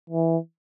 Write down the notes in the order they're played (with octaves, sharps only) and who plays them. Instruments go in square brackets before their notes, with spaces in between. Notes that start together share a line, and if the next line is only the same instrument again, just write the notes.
[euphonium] E3